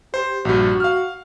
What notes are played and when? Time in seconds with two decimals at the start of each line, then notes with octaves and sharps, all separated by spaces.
0.14 G4 C5
0.45 A#1 G2 F#4
0.80 F5 F6